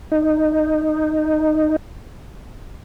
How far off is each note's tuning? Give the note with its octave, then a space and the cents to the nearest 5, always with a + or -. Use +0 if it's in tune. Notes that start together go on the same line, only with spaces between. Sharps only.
D#4 -10